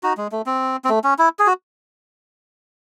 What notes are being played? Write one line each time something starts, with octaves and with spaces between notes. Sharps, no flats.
D#4 F#4
G#3
A3
C4
C4
A3
C#4
E4
G#4
F#4